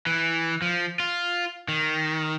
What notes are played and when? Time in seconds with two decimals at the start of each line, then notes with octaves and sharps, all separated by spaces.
0.07 E3
0.62 F3
1.00 F4
1.68 D#3